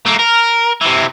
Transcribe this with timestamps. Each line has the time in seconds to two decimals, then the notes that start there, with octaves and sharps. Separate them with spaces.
0.06 A3 A#3
0.19 A#4
0.81 C3 E3